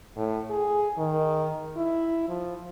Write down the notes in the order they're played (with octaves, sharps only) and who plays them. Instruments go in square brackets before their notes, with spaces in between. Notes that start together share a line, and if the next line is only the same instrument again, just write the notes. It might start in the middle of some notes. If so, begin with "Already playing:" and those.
[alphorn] A2
G#4
D#3
E4
F3